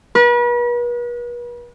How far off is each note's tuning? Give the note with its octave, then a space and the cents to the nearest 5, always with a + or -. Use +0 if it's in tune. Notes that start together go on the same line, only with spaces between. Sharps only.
B4 -40